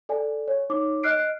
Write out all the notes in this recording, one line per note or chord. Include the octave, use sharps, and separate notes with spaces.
A4 D5 G#5
C#5
D#4 C#5 D6
D#5 F6 F#6 C7 D7